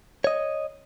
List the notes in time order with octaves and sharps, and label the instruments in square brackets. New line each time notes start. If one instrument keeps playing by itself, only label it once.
[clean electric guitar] C#5 D#5